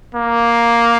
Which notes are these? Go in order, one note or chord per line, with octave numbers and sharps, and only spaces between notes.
A#3